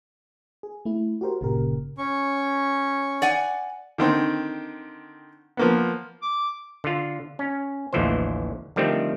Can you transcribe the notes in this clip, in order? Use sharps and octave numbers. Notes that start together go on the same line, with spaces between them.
G#4
A3 E4
F#4 G4 A#4 C5
G1 A#2 C#3 G4 A#4
C#4 C#6
D5 F#5 G#5
D3 D#3 C4
F3 A#3 B3
D6
D3 F4
C#4
A1 D#2 D3 E3 F3 C5
D3 D#3 F3 G3 A3 C4